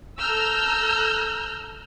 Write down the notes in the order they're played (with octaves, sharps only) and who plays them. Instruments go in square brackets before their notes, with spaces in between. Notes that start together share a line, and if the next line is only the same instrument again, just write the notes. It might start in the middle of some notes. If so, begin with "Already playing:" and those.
[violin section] A4 A#5 E6 F6 G6